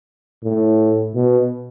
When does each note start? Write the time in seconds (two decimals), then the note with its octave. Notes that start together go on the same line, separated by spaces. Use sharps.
0.44 A2
1.15 B2